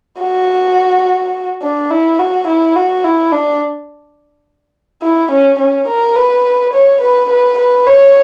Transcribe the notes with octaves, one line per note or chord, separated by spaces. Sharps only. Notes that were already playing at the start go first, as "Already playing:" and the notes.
F#4
D4
E4
F#4
E4
F#4
E4
D4
E4
C#4
C#4
A#4
B4
C#5
B4
B4
B4
C#5